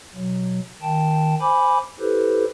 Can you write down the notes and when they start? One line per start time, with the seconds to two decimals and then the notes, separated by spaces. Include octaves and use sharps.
0.15 B2 F#3
0.82 D#3 G5 A5
1.41 C5 G#5 B5 D6
2.00 E4 G4 A4 B4 C5